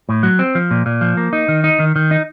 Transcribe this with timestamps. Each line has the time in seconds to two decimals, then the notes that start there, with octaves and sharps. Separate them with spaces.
0.09 A2
0.23 F#3
0.39 C4
0.55 F3
0.71 A#2
0.86 A#2
1.01 F3
1.17 A#3
1.33 D#4
1.48 D#3
1.64 D#4
1.79 D#3
1.96 D#3
2.11 D#4